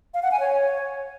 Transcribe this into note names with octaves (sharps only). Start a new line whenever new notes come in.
F5
F#5
G#5
C#5